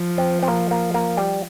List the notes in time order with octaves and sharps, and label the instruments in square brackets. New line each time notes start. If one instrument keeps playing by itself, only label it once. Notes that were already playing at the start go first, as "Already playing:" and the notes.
Already playing: [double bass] F3
[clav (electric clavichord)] C4
C4
A#3
A#3
A#3
G3